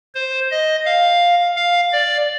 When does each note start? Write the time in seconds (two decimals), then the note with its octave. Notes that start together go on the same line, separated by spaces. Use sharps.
0.15 C5
0.51 D#5
0.86 F5
1.56 F5
1.92 D5